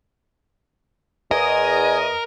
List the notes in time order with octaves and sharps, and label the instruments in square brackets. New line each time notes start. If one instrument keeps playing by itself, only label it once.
[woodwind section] E2 [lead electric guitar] A#4 [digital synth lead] D#5 [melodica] G#5